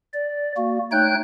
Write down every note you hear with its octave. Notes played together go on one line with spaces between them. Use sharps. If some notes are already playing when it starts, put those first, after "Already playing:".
D5
A#3 F#4
A3 D#4 C#5 G5 F#6 G6